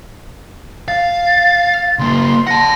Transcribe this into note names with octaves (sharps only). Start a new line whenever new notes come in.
F5 A6
C#3 A#3 C6
F#5 A5 A#6